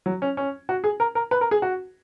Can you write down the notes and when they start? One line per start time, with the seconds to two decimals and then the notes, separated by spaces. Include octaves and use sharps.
0.06 F#3
0.22 C#4
0.37 C#4
0.69 F#4
0.84 G#4
1.00 A#4
1.15 A#4
1.31 B4
1.41 A#4
1.51 G#4
1.62 F#4